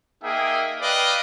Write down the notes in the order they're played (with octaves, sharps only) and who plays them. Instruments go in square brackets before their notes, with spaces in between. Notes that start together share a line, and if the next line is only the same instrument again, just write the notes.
[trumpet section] A#3 D#4 G#4 E5 G5
B4 D5 D#5 F5 G5